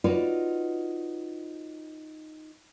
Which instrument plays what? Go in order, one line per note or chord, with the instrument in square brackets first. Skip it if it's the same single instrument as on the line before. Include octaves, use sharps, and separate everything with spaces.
[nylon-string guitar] D#4 F4 F#4 B4 C#5 D5